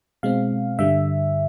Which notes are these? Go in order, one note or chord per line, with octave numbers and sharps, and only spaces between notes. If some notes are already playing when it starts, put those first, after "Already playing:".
B2 G#3 C4 F5
G2 D3 G3 E5